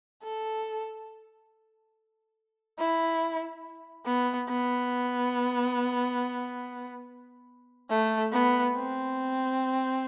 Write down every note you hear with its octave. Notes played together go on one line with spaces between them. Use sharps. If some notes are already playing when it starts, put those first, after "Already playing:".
A4
E4
B3
B3
A3
B3
C4